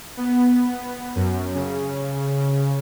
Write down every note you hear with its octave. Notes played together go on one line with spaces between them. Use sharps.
B3
F#2
C#3